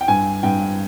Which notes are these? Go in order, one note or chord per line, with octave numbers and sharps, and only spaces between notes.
G5
G2 G#5
G2 G5